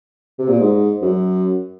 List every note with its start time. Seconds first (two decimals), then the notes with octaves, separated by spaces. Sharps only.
0.39 C3
0.48 A#2
0.59 G#2
1.02 F#2